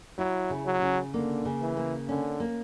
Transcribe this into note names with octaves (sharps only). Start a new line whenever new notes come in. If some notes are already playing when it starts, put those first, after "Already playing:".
F#3 E4
C#3
F#3
C#3
D3 A#3
C#3
E3
A#3
D3 C#4
A#3